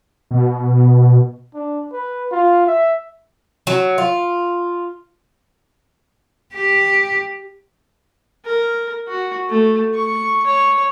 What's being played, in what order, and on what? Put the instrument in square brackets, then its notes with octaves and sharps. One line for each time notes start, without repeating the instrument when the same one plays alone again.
[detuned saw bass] B2
[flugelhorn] D4
B4
F4
E5
[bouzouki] F#3
F4
[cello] G4
[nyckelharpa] A#4
F#4
A3
C#6
C#5